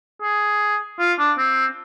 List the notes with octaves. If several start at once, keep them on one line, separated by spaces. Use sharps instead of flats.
G#4
F4
D4
C4